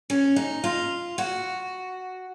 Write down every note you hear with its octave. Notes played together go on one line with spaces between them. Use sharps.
C#4
D#4
F4
F#4